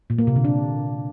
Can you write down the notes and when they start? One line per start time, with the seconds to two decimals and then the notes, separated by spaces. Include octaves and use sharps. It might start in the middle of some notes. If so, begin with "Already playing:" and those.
0.10 A#2
0.19 A#3
0.27 C3
0.36 D3
0.44 D4